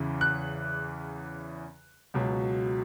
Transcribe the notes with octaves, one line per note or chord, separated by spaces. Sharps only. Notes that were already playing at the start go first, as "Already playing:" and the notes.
Already playing: E2 C#3 E3
F#6
C#2 B2 F#3